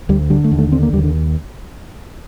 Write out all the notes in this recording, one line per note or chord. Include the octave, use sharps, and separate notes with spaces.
D2 G3
D3 G3
A3
D#2
A3
D3 C4
A#3
D#2 G3
D3